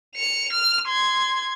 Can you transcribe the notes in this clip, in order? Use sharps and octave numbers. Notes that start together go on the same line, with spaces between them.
C#7 F7
F6
C6 G#6